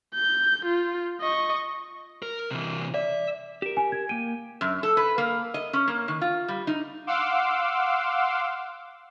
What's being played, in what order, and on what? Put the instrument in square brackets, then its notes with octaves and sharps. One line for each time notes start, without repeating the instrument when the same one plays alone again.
[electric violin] G6
F4
D#5 C#6
[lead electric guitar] A#4
C3 E3
[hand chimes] D5 [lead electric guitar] E5
[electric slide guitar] G4 A#4 [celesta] E7
[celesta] G#5
G#6
[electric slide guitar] A#3 G5 [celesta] D#7
[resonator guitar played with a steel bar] F#2
A4
B4
A#3
D#5
C#4
A#3
D#3
F4
G3
D#4
[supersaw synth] F5 F#5 C6 D6 E6